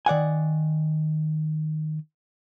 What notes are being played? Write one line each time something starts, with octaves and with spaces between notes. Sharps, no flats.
D#3 D5 F#5 G#5